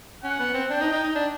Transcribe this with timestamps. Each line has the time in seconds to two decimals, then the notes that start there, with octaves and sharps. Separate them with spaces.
0.24 C#4 F#5
0.39 B3
0.54 C4
0.70 D4 G5
0.81 D#4
0.92 D#4
1.04 D#4
1.15 D4